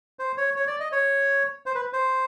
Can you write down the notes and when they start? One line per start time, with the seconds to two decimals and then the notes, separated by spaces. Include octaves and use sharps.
0.19 C5
0.37 C#5
0.56 C#5
0.67 D5
0.80 D#5
0.92 C#5
1.66 C5
1.75 B4
1.93 C5